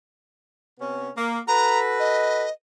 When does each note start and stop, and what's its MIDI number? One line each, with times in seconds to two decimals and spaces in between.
0.79 1.09 48
0.79 1.09 59
0.79 1.09 61
1.16 1.38 58
1.48 2.45 66
1.48 2.45 69
1.48 2.45 71
1.48 1.79 82
1.99 2.51 75